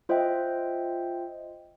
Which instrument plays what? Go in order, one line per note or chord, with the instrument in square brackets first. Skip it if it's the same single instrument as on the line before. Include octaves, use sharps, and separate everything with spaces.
[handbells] F4 C5 D#5 E5 G5